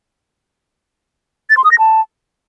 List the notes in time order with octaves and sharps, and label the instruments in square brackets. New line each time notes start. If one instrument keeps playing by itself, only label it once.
[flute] A6
C6
D#6
A#6
A5